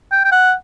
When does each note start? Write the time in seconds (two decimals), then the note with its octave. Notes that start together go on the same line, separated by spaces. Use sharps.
0.12 G5
0.24 G5
0.32 F#5